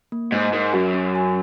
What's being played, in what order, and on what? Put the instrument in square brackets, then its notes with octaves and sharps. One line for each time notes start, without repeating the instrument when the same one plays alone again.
[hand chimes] A#3
[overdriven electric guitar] G#2 [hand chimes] D#5
[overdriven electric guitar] G#2 [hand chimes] A#4
[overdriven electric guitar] F#2 [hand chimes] F#4
[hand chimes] C#4
G#5